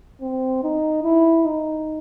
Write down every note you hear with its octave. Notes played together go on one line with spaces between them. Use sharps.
C4
D#4
E4
D#4